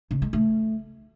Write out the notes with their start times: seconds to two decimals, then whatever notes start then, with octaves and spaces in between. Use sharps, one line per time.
0.11 C#3
0.22 G#3
0.33 A3